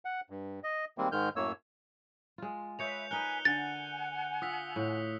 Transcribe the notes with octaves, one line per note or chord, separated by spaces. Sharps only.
F#5
G2
D#5
D#3 G3 G#3 A#3 C4
G#2 D#3 G#3 F6 G6
F#2 A2 A#3 C#5 E6
G#3 F4
B4 C#5 D#5 E5 G6 C#7 F7
D#4 A#4 B4 G#5 F#6 C#7 G7
D3 F#5 G#5 A6
F4 D#6 E6 B6
A2